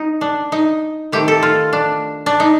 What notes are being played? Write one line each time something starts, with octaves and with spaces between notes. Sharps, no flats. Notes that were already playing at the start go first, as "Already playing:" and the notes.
Already playing: D#4
D4
D#4
D#3 A3 C4 G4
A4
F4
D4
D4
D#4